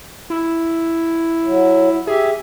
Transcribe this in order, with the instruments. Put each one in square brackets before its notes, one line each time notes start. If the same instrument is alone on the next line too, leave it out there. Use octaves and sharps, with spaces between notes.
[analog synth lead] E4
[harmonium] F#3
[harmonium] G4 E5 [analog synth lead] G#4